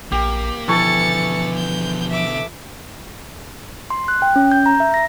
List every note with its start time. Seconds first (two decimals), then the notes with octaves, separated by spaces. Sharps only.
0.12 A#1 A#3 G4
0.68 B2 D3 E3 F3 A4 C#6 A6 C#7
1.56 G6
2.11 E5 D6
3.90 C6
4.08 F#6
4.22 G5
4.36 C#4
4.52 G6
4.66 A#5
4.80 E5
4.94 A#6